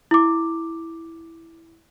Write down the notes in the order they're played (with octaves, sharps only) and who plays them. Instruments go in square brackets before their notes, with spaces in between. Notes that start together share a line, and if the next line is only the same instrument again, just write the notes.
[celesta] E4 D6